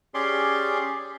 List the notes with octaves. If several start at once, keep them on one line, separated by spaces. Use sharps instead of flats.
C#4 G4 G#4 D5 C6